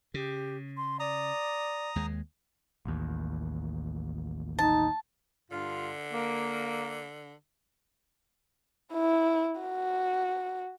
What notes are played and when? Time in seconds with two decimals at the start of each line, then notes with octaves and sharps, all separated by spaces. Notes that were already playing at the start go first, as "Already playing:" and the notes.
0.14 C#3 G4
0.77 C6
1.00 D5 A#5 D#6
1.96 D#2 G#3
2.86 A1 D#2
4.59 D#4 A5
5.51 G2 D3 F4
6.13 A#3
8.94 E4
9.61 F#4